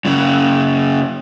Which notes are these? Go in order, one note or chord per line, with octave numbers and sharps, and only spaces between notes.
F#2 C#3